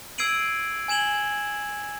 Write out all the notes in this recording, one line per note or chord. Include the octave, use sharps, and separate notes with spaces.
E6 G#6 C7 D7 D#7 F#7
G#5 G#6 E7 F#7 G7